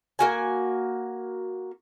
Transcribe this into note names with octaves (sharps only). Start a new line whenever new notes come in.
A#3 F#4 G#5